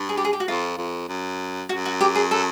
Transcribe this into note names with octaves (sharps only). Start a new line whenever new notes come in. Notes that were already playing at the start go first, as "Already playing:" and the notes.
Already playing: G2
G#4
G4
G#4
G4
F#4
F2 F4
F2
F#2
F#2 F#4
F#4
G4
G#4
A4